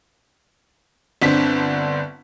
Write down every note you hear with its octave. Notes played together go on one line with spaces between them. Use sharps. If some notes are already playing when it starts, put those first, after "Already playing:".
G1 D3 C4 B6